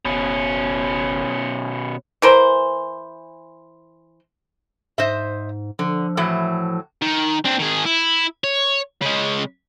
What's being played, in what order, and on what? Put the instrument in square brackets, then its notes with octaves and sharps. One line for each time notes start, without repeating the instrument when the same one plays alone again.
[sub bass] F#1 [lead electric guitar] B2 C#4
[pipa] E3 A#4 C5
[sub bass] G#2 [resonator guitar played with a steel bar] C5 D#5 E5
[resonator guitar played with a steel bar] D3 [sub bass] F3
[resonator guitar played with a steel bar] A2 E3 F#3
[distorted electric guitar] D#3
C4 D4
D#3 G#4
E4
C#5
C#3 G#3